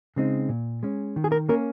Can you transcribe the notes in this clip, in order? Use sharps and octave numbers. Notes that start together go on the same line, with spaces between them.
C#3 G#3 C4 D#4
A#2
G#3 C#4
D#3
G#4
A#4
A#3 C#4 A#4